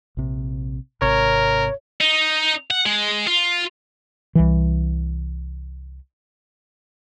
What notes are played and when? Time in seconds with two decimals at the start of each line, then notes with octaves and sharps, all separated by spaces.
0.17 A#1 C3
1.02 G#1 C3 A#4 C#5
2.01 D#4
2.71 F#5
2.86 G#3
3.27 F4
4.35 C2 E3